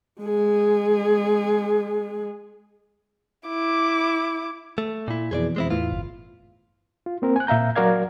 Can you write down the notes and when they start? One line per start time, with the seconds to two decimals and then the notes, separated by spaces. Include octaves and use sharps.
0.21 G#3 G#4
3.48 E4 D6
4.78 A3
5.08 A#2 E4
5.31 F2 B2 E3 G#4 C5 D5
5.56 G#3 C4 E4
5.70 E2 A2 E3 F4
5.92 G1
7.06 F4
7.22 A#3 C4 A#4
7.36 G#5 F#6
7.47 A#2 E5 F5 A#5 G6
7.76 F#3 F#4 A#4 D5 F5 G#6